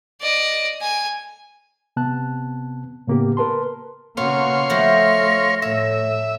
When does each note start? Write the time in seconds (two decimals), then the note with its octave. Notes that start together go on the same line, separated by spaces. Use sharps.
0.21 D5 D#5
0.81 G#5
1.97 C3 B3 A5 F#6
3.07 A2 C#3 A#3 B3 G4
3.37 A#4 B4 A5 C6
4.17 C#3 A#3 B3 F#4 C#5 F5 C6
4.70 F3 A3 E4 F#4 A#6
5.62 A2 A3 C#5 E5